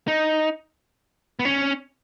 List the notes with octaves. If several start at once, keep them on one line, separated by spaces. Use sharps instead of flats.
D#4
B3
C#4